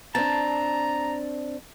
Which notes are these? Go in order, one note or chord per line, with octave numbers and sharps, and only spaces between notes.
C4 D4 A5 A#5